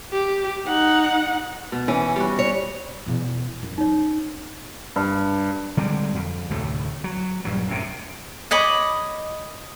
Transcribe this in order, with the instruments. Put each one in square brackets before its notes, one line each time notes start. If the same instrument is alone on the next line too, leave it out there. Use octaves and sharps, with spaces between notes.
[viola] G4
D#4 F#5
[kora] B2
[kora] E3 [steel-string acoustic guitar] C#4
[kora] G3 F#4
[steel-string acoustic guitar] C#5
[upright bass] E2 B2
F#2
[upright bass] C#4 [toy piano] D#4 C#5
[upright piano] G2
[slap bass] D3 G3 G#3 C4
F2
D2 A2 C3 A3
F#3
A#1 G2 F#3
F#2 A2 C3
[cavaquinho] C#5 D#5 B5 D6